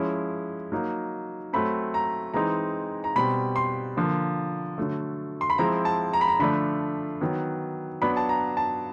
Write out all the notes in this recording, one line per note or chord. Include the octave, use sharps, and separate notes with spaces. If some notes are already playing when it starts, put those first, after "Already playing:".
Already playing: F3 G#3 C#4 E4
F#3 A#3 D#4
F#3 A3 C4 B5
A#5
E3 G#3 C4 D#4 A#5
A#5
B2 G3 C4 B5
C6
D3 F3 A#3
D3 F#3 A3
C6
B5
F3 G#3 C4 E4 A#5
A5
A#5
B5
A#5
D3 F3 A3 D4 B5
D#3 F#3 B3
F#3 B3 D4 B5
A5
A#5
A5